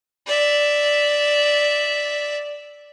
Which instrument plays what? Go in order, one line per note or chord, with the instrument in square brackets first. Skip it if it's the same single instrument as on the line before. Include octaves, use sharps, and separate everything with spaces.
[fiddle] D5 E5